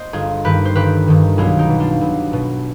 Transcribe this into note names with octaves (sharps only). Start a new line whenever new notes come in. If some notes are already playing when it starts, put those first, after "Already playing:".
Already playing: C5 D#5
G1 F4 G#4
G2 D#3 G4 B4
C5
G1 G4 B4
G2 D#3
B1 F4 G#4
D#4 G4
B2
D4 F4
B1
B2